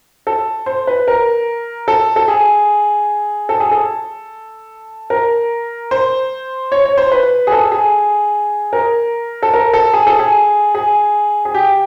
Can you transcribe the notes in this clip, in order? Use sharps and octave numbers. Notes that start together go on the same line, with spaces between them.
A4
C5
B4
A#4
A4
A4
G#4
A4
G#4
A4
A#4
C5
C#5
C#5
C5
B4
G#4
A4
G#4
A#4
A4
A#4
A4
G#4
A4
G#4
G#4
G#4
G4